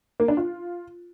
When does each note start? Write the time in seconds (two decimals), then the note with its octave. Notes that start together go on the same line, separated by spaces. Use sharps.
0.20 A#3
0.28 D4
0.37 F4